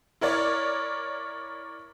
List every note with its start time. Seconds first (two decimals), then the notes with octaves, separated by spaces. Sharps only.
0.21 E4 A#4 C#5 D5